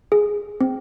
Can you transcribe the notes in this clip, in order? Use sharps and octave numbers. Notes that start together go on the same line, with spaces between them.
G#4
C4